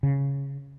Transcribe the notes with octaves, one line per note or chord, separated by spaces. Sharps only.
C#3